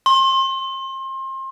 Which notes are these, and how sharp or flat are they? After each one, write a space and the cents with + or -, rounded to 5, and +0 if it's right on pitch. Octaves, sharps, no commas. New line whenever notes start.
C6 +30